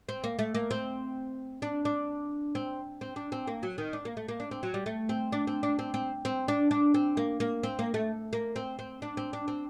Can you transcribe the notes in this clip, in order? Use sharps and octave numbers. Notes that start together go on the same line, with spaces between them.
C4
A#3
A3
A#3
C4
D4
D4
C4
C4
D4
C4
A#3
F#3
D#3
D4
A#3
A3
A#3
D4
C4
F#3
G3
A3
C4
D4
C4
D4
C4
C4
C4
D4
D4
C4
A#3
A#3
C4
A#3
A3
A#3
C4
C4
D4
C4
D4
C4